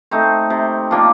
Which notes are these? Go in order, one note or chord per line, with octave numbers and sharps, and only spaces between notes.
A3 C4 D#4
C3
F3 A#3 D4